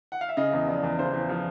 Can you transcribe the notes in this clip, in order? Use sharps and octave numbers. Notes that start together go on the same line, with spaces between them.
F#5
F5
E5
C#3 D#5
E2
F3 D5
E2
C#3 C5
E2
F3